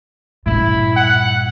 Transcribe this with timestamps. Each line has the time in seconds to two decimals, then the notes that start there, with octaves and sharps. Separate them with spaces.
0.46 G2 A#2 E4
0.96 F#5